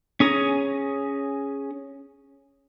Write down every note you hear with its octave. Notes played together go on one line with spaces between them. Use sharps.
C#4 G#4 A#5